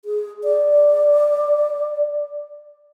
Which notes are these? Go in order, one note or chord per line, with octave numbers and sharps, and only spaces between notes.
G#4
D5